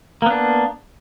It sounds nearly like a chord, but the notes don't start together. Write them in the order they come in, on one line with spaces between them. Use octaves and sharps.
A#3 B3 D4